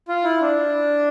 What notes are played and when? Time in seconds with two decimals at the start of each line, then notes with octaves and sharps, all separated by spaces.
0.08 F4
0.24 E4
0.41 D4